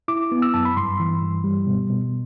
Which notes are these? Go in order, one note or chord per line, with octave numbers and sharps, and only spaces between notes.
E4 D6
B3
E6
F#2 A5
B5
G2 C6
E3
G2
G3
B2
B2